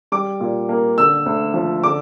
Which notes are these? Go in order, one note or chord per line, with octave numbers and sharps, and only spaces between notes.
G3 D6
A#2
A#3
D3 E6
D2
F3
D3 D6